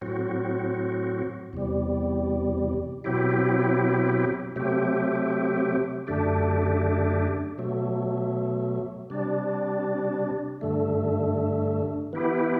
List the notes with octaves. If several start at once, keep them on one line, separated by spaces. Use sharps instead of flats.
A2 F#3 C4 F#4
E2 C3 G3
B2 F#3 C4 E4 G4
C3 F#3 A3 C4 G4
F#2 D3 A3 D4 G4
B2 F#3 A3
C3 G3 D4
G2 D3 A3
E3 B3 E4 G4